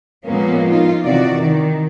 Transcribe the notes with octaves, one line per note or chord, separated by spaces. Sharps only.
A#2 F3 G#3 A#3 B3 C#4
D#4 F4
C3 D#3 E3 F#4 D5
D#3